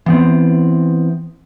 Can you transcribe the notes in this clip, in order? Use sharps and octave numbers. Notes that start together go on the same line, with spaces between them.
E3 B3 C4